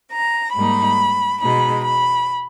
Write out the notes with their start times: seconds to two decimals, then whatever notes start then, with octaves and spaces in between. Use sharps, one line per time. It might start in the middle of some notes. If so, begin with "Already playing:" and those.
0.12 A#5
0.54 G#2 G3 A#3 D#4 B5
1.41 B2 G#3 D#4 B5
1.84 B5